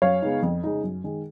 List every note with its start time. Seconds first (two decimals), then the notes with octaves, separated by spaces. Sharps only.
0.02 F#2 C#5 F5
0.22 C#3 G#3 B3 D#4
0.42 F2
0.64 C#3 G#3 D#4
0.84 F#2
1.04 D#3 G#3